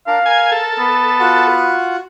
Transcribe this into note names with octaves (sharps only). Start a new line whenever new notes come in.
D4 A#4 F5
A#4 G#5
A4
B3
F4 F#4 F#5